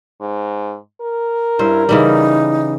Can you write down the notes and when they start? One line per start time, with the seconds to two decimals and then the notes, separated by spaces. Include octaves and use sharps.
0.20 G#2
1.01 A#4
1.59 G2 C#4 E4 C5
1.89 C#3 E3 G3 D#4